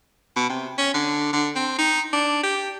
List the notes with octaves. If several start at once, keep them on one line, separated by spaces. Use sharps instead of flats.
B2
C3
C#4
D3
D3
C4
D#4
D4
G4